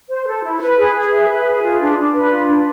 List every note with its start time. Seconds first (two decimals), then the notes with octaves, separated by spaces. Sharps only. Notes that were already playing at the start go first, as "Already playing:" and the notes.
0.09 C5
0.27 A4
0.43 E4
0.60 B4
0.78 G#4
0.95 G#4
1.11 E5
1.29 B4
1.45 G#4
1.63 F4
1.80 D4
1.98 D4
2.14 B4
2.31 F4
2.48 D4